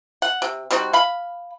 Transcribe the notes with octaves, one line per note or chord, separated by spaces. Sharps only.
F#5
C3
G3 C4 D#4 F#4
F5 B5